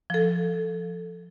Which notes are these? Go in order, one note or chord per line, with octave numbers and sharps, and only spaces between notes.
F3 A4